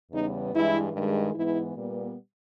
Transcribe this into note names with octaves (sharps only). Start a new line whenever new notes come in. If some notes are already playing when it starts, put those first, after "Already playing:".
E2 C#3 G3 B3 D#4
G2 E3 G#3 E4
G2 D#3 G#3
G#2 E3 G#3 B3 E4
A#2 G3 B3